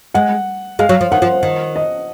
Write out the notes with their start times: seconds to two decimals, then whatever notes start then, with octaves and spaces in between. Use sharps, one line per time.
0.14 G#3 F#5
0.79 G#3 F5
0.89 F#3
1.01 F3
1.12 D#3 F#5
1.22 F3
1.43 D#3
1.76 D#5